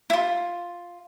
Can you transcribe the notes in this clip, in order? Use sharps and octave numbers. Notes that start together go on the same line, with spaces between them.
E4 F4